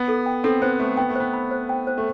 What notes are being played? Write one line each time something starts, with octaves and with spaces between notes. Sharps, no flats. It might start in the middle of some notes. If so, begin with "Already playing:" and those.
Already playing: B3
A4
G5
C4 A4
B3 C5
A3 A4
B3 G5
A3
B3 C5
B5
C5
G5
C5
A3